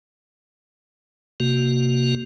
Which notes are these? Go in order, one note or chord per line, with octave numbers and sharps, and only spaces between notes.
C3 A#3 F#4